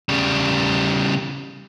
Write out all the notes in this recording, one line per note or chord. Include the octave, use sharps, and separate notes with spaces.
C#3 G3